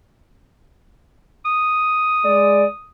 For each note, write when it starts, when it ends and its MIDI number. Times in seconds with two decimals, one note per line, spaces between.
1.45 2.90 87
2.25 2.65 56
2.25 2.65 74